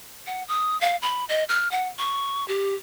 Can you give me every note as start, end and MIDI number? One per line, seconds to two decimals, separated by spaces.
0.27 0.43 78
0.48 0.79 87
0.81 0.96 77
1.02 1.25 83
1.29 1.44 75
1.49 1.70 89
1.71 1.88 78
1.99 2.46 85
2.48 2.74 67